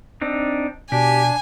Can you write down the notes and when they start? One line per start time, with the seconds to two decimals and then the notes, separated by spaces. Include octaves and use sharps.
0.22 C4 D4 D#4
0.92 B2 D4 G4 G#5